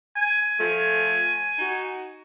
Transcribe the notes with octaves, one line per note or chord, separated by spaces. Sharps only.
G#5
F3 A3 A4
D#4 F#4